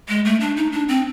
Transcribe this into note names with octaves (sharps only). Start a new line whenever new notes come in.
G#3
A3
D4
D#4
D4
C4